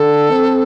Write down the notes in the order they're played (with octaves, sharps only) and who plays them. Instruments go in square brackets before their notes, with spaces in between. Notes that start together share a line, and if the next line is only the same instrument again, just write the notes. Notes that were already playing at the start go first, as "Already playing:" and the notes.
Already playing: [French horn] D3 [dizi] A4
[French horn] C4